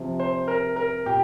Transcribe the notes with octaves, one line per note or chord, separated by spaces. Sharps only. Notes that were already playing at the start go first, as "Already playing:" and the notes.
Already playing: C3 F3
C5
A#4
A#4
A#2 G4